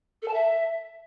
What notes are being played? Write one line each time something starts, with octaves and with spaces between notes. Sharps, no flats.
A4
A5
E5